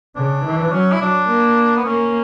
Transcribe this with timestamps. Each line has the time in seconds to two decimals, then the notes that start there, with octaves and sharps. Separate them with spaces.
0.16 C#3 D4
0.45 E3
0.72 F#3 C#4
0.92 E4
1.01 F#3 D4
1.28 A#3
1.76 B3
1.85 A#3 C#4